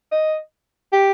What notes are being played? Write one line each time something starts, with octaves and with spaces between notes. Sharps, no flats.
D#5
G4